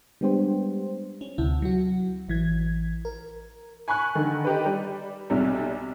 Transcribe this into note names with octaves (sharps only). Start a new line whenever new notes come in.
G3 G#3 B3 D4 G4 C5
C#4
D2 C3 E4
F#3 F#4
A1 E3 G#6
A#4
G#5 B5 C#6 F#6
D3 D#3
D#4 G4 B4
G3
B1 C3 G3